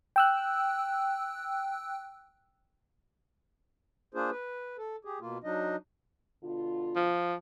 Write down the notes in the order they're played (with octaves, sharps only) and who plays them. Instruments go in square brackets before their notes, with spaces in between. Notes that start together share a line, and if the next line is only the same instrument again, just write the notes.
[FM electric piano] G5 E6 F#6
[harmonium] A#3 D4 F4 G#4 C5
B4
A4
G4 G#4
B2 A#3 F4
F#3 D4 D#4 D#5
[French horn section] B2 D3 F4
[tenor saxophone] F3